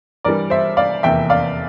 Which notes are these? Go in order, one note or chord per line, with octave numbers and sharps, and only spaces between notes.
G2 E3 G3 A#4 D5
C5 E5
D5 F5
F1 E2 E3 A#3 E5 G5
D5 F5